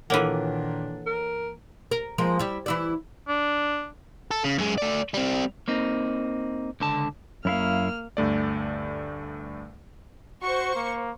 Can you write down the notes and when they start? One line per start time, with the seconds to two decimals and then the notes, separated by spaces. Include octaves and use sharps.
0.10 A#2 D#3 E3 A#3 D4 A4 C#5 F#5
1.06 A#4
1.91 A#4
2.18 F3 G#3 A#3
2.39 G3 E4
2.66 E3 E4 D5
3.28 D4
4.31 A4
4.44 C#3
4.58 F#2 G#3
4.78 A3 D5
5.14 G3 C4
5.68 A#3 C4 D#4
6.80 C#2 D3 A5
7.45 F#2 A#3 E4 F5 F6
8.17 D2 G2 A3 D5
10.42 F#4 C5 C#6
10.76 A#3